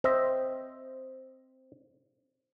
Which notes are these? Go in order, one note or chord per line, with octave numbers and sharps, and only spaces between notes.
C4 C5 D#5 E5